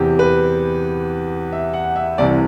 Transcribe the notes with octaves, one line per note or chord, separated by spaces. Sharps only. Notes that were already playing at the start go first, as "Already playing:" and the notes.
Already playing: E2 C3 E3 G4
B4
E5
F#5
E5
C2 C3 E3 D5